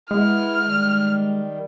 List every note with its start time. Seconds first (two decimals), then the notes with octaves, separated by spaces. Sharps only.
0.11 G#3 B3 E4 F6
0.65 D#3 G3